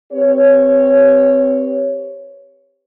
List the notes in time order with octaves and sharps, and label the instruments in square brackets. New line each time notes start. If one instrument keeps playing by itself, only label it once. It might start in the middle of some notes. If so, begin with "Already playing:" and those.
[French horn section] C4 G4 B4 C#5